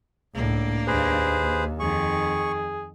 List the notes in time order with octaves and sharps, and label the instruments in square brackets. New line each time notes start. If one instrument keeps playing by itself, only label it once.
[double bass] C#2 A2 [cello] A#3 D4
[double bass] D#2 [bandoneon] G#4 B4 C5
[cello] F2 D#3 [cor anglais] G#4 [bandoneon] C#6